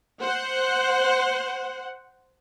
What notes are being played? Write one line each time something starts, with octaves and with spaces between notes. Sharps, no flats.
C5 F#5